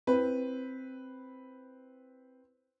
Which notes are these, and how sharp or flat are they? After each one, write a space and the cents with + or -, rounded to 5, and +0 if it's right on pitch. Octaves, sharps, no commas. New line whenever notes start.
C4 +0 E4 +0 B4 +0